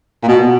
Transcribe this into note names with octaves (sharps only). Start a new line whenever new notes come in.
A#2
B2